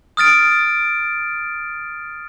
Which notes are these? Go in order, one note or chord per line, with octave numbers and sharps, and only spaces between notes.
D#6 F6 A6 D7